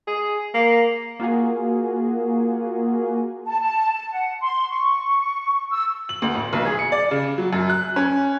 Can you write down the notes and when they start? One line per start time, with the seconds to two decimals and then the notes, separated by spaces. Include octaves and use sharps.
0.07 G#4
0.54 A#3
1.20 A#3 F4 F#4 G#4
3.45 A5
3.60 A5
3.93 A5
4.11 F#5
4.41 C6
4.69 C#6
5.70 E6
6.09 F#7
6.22 D2
6.35 A1
6.53 B1
6.65 G#4
6.79 C#7
6.92 D5
7.11 C#3
7.38 F#3
7.53 F#2
7.70 F#6
7.96 C#4